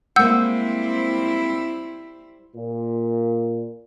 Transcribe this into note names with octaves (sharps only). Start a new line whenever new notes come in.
G3 G#3 A#3 C4 E4 F#5 E6 G6
A#2